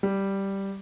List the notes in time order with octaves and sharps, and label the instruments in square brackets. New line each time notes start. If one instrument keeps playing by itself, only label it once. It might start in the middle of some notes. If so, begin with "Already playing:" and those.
[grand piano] G3